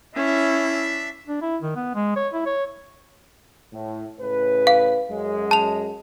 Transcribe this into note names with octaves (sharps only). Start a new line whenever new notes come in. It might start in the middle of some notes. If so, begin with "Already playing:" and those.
C#4 D4 E4 E5
D4
E4
D#3
B3
G#3
C#5
E4
C#5
A2
A2 C#3 B4
F5
F#2 G#3
A5 F7